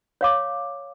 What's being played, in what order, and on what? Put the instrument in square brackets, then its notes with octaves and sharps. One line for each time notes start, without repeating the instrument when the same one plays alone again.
[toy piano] C#5 F5 D6